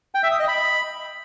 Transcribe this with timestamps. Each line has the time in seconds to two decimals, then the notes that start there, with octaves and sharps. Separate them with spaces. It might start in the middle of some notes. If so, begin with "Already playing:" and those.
0.15 G5
0.23 E5
0.31 D#6
0.40 D#5
0.48 B5